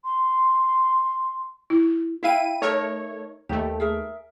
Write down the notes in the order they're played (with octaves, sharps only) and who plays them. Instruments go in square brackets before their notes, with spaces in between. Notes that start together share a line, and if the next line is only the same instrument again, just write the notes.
[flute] C6
[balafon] E4
[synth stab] E4 D#7 [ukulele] E5 F5 G5
[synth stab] A3 C#5 [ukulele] D#4 A#4
[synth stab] D#2 A3 [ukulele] G4
[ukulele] G#4 A#4 E5